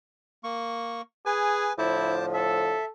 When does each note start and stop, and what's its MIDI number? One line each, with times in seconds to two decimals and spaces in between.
0.44 1.02 58
0.44 1.02 85
1.26 1.72 68
1.26 1.73 71
1.26 1.73 80
1.78 2.76 45
1.78 2.76 50
1.78 2.76 53
1.78 2.16 64
1.78 2.26 72
1.78 2.26 81
1.78 2.26 86
2.34 2.90 69
2.34 2.85 76